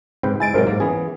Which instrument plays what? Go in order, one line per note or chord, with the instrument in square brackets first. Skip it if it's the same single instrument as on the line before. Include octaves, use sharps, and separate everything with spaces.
[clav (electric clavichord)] G#2 B4 G5 [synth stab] C#3 C4
[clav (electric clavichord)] G#3 E4 [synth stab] G#5 A6 D7
[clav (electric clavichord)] G#2 C3 F#3 [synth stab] E4 A#4 C5
[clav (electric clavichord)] G#2 A#3
[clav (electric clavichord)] E3 B3 G#4 [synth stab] C#4